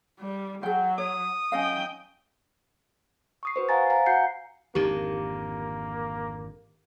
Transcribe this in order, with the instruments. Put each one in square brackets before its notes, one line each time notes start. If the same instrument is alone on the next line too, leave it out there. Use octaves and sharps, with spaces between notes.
[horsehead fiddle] G3
[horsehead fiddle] F#3 [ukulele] G#4 F#5 [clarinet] G5
[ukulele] C#5 [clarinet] D#6
[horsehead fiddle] F#3 G5 [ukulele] C#4 D#5 F5
[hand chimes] C#6 D#6 C7
F#4 B4 C5
C5 F5 F#5 G#5 A#5 A6
F5 G#5 A#5
F#4 F#5 G6 C7 C#7
[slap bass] G#1 F2 D3 [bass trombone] A#3 [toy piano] D#4 G4